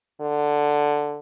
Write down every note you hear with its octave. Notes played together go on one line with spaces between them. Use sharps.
D3